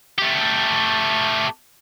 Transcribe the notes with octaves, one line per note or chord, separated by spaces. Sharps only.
A3 G4